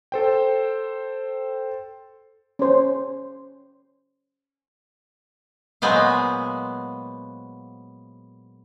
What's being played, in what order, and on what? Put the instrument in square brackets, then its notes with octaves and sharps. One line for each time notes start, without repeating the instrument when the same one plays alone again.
[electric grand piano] A4 C5 G5
[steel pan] C#4 C5
[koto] A#2 F#3 G#3 B3 C5 F5